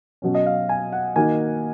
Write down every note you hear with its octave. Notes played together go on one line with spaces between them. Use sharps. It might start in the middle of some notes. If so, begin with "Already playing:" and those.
B2 F#3 C#4
D#5
F5
G#5
F#5
D#3 A#3 D#4 F#4 G#5